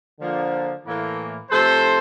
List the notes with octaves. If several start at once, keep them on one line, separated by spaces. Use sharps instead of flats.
D3 F3 A#3
A2 E3 A#3
C3 F3 A3 A4 C5